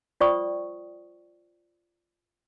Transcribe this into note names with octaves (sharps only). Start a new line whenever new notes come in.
F4 C5 D5 G5 C#6 D#6